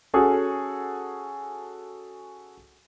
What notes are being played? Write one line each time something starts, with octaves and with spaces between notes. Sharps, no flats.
C#4 F#4 G#4 A4